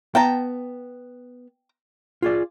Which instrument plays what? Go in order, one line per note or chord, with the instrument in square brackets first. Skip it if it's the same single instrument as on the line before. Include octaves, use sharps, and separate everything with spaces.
[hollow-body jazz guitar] B3 [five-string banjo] G5 A5 A#5
[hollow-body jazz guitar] F4 G#4 D5